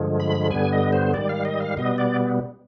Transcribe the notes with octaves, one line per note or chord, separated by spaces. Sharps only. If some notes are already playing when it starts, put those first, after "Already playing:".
Already playing: G2 D3 F3 G#3
B5
G2 D3 G3 B3 G#5
D#5
C5
G#2 D#3 G3 D5
F5
D#5
F5
B2 G3 B3 D#5
D5